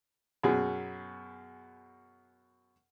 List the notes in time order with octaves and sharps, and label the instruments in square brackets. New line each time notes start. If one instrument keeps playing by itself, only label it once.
[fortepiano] F#2 B2 G#4